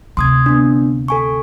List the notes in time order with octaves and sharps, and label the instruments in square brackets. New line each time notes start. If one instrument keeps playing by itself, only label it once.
[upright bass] D2 C3 [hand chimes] C6 D#6 G#6
[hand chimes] B3 D4
A4 G#5 C#6